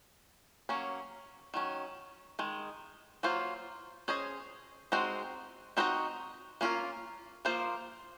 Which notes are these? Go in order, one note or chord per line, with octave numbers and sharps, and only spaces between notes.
F#3 A#3 C#4
D#3 F#3 C#4
D#3 G#3
F#3 A#3 F4 C5
C#4 G#4 C5 D#5
G#3 C4 D#4 F#4 C5
C4 D#4 F#4 C5 D#5
A#3 C#4 F4 A#4
F3 A#3 F4 C5